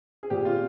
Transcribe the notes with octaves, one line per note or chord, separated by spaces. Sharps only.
G#4
A#2 G4
F4